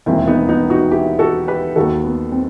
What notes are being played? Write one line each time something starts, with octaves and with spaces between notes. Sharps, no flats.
E1 D#2 D#3 C4 E4
B3 D#4
B3 D#4
D#4 F#4
E4 G4
F#4 A4
G4 B4
D#2 D#3 F#4 A4
B3
C4